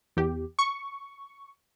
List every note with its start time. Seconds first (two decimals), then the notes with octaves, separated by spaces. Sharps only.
0.17 E2 G4
0.59 C#6